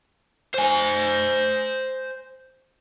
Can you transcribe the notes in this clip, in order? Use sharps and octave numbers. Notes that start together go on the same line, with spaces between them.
C5 G#5